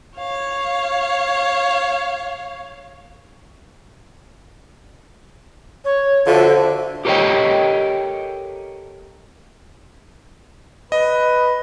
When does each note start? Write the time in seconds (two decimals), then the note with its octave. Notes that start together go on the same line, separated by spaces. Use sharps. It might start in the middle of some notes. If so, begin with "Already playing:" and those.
0.17 C#5 F5
5.85 C#5
6.26 D3 F3 F#4 A4 E5
7.05 G4 A4 A#4 C#5 D#5 G5
10.92 B4 D#5